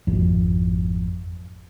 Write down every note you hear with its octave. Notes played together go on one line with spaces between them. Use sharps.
G#1 F2